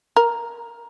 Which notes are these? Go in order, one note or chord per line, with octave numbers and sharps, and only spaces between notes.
A#4